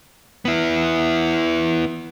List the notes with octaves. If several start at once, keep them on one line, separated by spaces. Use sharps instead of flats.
B3 E4